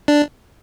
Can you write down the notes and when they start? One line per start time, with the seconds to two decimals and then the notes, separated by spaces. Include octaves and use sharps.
0.08 D4